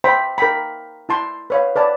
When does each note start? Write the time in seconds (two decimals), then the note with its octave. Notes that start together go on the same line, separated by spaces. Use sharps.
0.04 C5 E5 G5 B5 C6
0.38 A#4 G5 B5
1.09 E4 A5 C6
1.50 B4 C#5 F5
1.76 B4 D5 A5